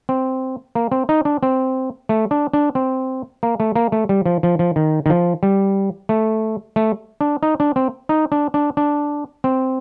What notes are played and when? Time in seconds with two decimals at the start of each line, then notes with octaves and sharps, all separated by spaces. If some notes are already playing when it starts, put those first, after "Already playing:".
0.09 C4
0.75 A#3
0.92 C4
1.09 D#4
1.25 D4
1.43 C4
2.09 A3
2.31 D4
2.54 D4
2.75 C4
3.43 A#3
3.60 A3
3.76 A#3
3.92 A3
4.09 G3
4.26 F3
4.43 F3
4.59 F3
4.76 D#3
5.06 D#3
5.10 F3
5.43 G3
6.09 A3
6.76 A3
7.21 D4
7.43 D#4
7.60 D4
7.76 C4
8.09 D#4
8.32 D4
8.54 D4
8.77 D4
9.44 C4